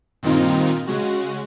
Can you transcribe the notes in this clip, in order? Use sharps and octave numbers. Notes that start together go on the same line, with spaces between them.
G2 A#2 D#3 C4 D#4 F4
C#3 G#3 F#4